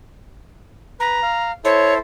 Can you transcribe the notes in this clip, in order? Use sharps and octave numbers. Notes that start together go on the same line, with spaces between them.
B4 A#5
F5
E4 A4 C5 C#5